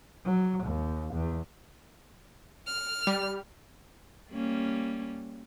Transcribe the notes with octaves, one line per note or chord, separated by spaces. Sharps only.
F#3
D#2
E2
F6
G3
G3 A#3 C#4